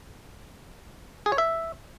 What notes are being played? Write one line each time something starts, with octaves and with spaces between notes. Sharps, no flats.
G#4
C#5
E5